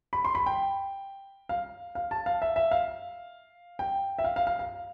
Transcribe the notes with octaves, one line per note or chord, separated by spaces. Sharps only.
B5
C6
B5
G5
F5
F5
A5
F5
E5
E5
F5
G5
E5
F5
F5
F5
F5